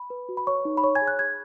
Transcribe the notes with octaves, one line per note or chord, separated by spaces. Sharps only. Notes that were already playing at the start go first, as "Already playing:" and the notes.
Already playing: B5
B4
F#4
B5
B4 C#5 C#6
D#4
B5
C#5 C#6
G#5 G#6
G#4
F#6
G#4 G#6